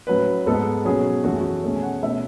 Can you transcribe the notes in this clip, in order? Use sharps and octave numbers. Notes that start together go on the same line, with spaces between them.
A2 F#3 C#4 B4
G#2 G#3 B3 A4
B2 F#3 C#4 G#4
F#2 E3 A3 C#4 F#4
G#4
F#4
B2 A3 C#4 G#4
G#5
F#5
B2 A3 C#4 E5